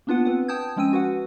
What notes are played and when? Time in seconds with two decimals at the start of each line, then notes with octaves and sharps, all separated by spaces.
0.07 A#3 B3 D4 F4 B4 F#5
0.25 C4 B4 F#5
0.48 G5 A5 D#6 G6 G#6
0.76 F3 G#3 C#4 G5 E6 D#7
0.93 F#4 B4 F#5